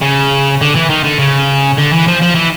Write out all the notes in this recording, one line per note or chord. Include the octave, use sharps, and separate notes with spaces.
C#3
D3
E3
D#3
D3
C#3
D3
E3
F3
F3
E3